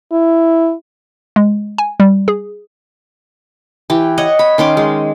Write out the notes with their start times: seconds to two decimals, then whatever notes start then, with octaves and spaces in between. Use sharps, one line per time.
0.12 E4
1.36 G#3
1.78 G#5
2.00 G3
2.28 G#4
3.90 E3 G4
4.18 C#5 D#5 F#5
4.39 B5
4.58 D#3 C#4 C6 D6
4.77 G#3